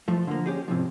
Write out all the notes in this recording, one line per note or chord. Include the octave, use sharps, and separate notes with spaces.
F3 A3
D3 F3 A#3
C#4 G4 G#4
G#2 C3 E3 F3